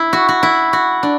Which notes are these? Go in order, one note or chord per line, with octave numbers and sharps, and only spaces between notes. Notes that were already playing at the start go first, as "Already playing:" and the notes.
Already playing: E4
F#4
F#4
E4
F#4
D4